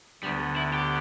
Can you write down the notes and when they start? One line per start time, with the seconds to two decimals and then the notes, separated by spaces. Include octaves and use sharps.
0.23 D2 D3 G3 B3
0.56 E4
0.74 G4